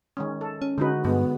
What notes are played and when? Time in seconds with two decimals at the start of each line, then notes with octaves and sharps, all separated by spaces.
0.17 D#3 G#3 C#4
0.41 A4
0.62 C#4
0.78 D3 G#3 D#4 F#4 B4
1.05 G2 G#3 B3